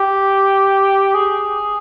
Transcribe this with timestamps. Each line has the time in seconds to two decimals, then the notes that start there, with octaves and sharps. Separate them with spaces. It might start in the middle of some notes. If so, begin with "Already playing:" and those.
Already playing: G4
1.15 G#4